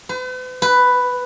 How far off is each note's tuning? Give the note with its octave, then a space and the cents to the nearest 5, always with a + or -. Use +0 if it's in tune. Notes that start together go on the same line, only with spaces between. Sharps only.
B4 +45
B4 +5